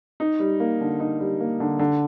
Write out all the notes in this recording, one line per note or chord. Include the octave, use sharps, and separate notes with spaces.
D#4
G3
A#3
D3
D#4
G3
A#3
D3
D3